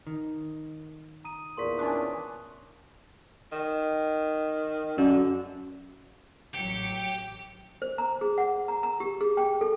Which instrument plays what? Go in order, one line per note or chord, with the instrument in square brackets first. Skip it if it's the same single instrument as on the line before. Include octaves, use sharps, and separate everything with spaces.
[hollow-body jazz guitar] D#3
[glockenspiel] A#5 D#6 D#7
[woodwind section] E2 A#2 [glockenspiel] C6 C#6 B6
[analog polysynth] C#4 D4 [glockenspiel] G#5 D#6 F#6
[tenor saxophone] D#3
[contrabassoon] F#2 [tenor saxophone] D3
[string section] A1 F#3 C#7 [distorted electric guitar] G4
[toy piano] C5
A#5
G#4
F#5
A#5
A#5
G4
G#4
G5
A4